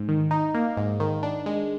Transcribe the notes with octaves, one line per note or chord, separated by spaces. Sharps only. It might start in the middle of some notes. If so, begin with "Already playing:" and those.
Already playing: G#2
D#3
D#4
A#3
G#2
D#3
D4
G#3